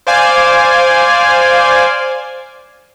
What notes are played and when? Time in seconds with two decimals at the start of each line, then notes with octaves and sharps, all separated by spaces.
0.07 C5 D5 F5 G#5